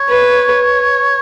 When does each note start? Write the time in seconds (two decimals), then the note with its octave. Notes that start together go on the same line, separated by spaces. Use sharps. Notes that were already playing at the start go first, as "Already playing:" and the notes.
Already playing: C#5
0.08 B4